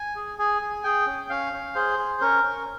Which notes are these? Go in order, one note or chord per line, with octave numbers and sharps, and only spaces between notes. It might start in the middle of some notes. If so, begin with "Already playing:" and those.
Already playing: G#5
G#4
G#4 G#5
G#4
G#4 G5
C#4
C#4 F5
C#4
G#4 C5
G#4
C#4 A#4
C#4